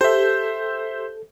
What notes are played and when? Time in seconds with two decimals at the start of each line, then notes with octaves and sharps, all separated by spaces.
0.01 G4 A4 C5 E5 G6